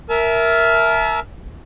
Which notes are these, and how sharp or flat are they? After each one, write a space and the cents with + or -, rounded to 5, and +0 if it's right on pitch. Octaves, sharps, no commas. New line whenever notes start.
A#4 +0 E5 +0 A5 -40